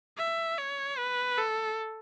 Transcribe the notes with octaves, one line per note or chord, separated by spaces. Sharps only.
E5
C#5
B4
A4